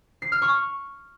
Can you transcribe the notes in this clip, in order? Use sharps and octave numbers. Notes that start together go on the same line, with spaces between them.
C7
F6
C#6